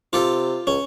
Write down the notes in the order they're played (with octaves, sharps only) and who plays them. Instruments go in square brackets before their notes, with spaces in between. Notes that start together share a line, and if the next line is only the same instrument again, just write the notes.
[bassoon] C3 [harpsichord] F4 G4 A4
[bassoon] C#2 [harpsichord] C#4